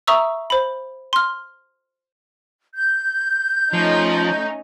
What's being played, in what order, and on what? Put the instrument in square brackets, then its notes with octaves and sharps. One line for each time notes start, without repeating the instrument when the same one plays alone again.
[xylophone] E5 A#5 C#6 D#6 E6
C5 B5
C6 F6
[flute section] G6
[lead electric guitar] F3 [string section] A3 C#4 D#4